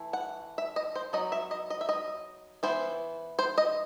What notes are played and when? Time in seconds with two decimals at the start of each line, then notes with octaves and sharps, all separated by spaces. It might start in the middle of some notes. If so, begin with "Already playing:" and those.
Already playing: E3 A3 E4
0.13 F#5
0.58 E5
0.76 D#5
0.95 C5
1.13 F#3 B3 D#4 D#5
1.32 E5
1.51 D#5
1.70 D#5
1.81 E5
1.89 D#5
2.63 E3 B3 E4 C5
3.39 C5
3.58 D#5